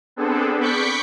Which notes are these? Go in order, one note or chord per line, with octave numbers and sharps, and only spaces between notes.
B3 C4 D4 G#4 A4
B5 C#6 D6 G6 B6 C#7